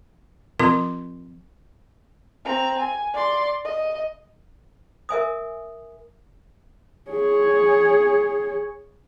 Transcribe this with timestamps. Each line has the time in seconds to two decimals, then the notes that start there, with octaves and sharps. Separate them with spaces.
0.60 F3 C4 F4 A#4 C6
2.45 C4 A#5
2.79 G#5
3.13 D5 C6
3.65 D#5
5.09 A#4 E5 G#5 D#6
7.10 G#4 C#5